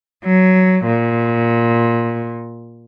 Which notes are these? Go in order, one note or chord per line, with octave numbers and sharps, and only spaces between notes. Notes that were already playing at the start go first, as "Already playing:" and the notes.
F#3
A#2